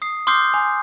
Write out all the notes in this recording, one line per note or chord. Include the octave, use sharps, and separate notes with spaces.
D#6 C7
C6 D6 D#6 F6 G6 C7
G#5